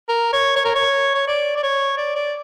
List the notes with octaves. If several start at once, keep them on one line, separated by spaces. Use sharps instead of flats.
A#4
C#5
C#5
A#4
C#5
C#5
D5
D5
C#5
D5
D5